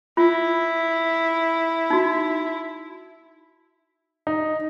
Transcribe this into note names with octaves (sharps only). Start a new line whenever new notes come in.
E4 F4
D#4 F#4
D#4